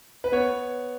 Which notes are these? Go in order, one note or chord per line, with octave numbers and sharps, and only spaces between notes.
B4
B3 C#5